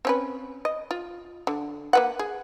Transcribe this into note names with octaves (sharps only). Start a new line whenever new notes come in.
C4 C#4 B4
D#5
F4
D3
A#3 B4 F#5
G#4